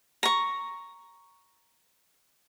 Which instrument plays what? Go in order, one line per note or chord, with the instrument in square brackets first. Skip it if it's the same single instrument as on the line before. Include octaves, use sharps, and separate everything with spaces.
[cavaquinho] A#5 C#6